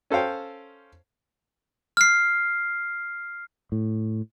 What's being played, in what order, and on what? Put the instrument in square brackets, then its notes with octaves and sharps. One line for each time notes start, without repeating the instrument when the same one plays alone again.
[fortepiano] C#4 A4 C5 F5 G5
[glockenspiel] F6 C7
[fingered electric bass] A2